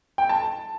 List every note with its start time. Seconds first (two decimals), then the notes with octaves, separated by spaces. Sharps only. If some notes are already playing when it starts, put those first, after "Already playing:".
0.18 G5
0.29 A5